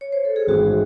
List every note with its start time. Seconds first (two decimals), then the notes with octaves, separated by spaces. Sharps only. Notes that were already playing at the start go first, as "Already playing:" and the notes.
0.01 C#5
0.12 C5
0.25 A4
0.36 G#4
0.47 A1 G#2 D#3 G#3 C4 F#4